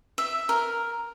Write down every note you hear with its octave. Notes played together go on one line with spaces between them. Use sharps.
E5
A#4